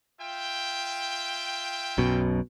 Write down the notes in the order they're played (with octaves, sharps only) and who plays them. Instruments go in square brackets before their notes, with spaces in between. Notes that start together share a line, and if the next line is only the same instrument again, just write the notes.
[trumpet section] F4 E5 G5
[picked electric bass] B1 F#2 B2